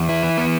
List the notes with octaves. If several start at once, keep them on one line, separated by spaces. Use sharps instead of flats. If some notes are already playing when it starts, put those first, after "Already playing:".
Already playing: E2
E4
E3
B3